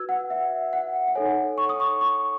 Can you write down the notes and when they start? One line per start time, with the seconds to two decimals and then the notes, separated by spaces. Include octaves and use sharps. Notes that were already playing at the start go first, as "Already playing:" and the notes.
Already playing: F#4 B4 E6 G#6
0.09 F#5
0.30 E5
0.73 F#5
1.08 F#5
1.15 D#4 A4 C#5 G#5
1.58 C#6
1.69 D#6
1.80 C#6
2.01 C#6